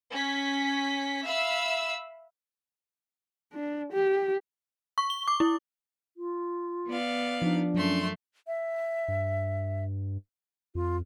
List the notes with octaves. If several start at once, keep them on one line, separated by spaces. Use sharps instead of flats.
C#4 B6
E5 F5 B5 E6
D4
G4
C#6
G7
D6
E4
F4
B3 D5 F5
F3 D4 D#4
F#2 F#3 A3 C#4 C6
E5
G2
F2 F4